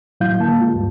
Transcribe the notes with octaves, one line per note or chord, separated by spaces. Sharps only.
A2 F#3 E4 F5 G6
D3 A#3 A5
G#3 F4
D2 G2